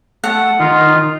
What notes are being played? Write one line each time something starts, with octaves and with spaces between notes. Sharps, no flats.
A3 F#5
D#3 D#4 F4